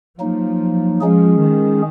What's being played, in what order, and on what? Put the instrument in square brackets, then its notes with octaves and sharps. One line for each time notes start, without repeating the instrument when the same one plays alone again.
[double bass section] F3 [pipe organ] F#3 A#3 D#4
[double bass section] F3 [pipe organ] G#3 C#4 G#4
[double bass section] D#3